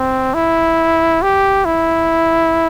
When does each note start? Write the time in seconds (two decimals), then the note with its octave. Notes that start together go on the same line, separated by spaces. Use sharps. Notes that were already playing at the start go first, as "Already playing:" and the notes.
Already playing: C4
0.34 E4
1.22 G4
1.65 E4